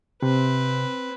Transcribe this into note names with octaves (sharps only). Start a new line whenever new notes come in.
C3 C4 B4